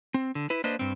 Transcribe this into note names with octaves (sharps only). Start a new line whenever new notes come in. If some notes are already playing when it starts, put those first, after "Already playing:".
C4
D3
E4 B4
A#3 D4 B4 C5 D#5
G2 C4